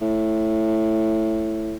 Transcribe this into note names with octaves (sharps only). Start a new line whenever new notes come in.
A2